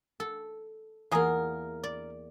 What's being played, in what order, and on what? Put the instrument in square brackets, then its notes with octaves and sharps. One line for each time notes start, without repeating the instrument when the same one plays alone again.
[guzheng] A4
[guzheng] E2 A#3 [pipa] F4 G#4 A#4
[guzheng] D5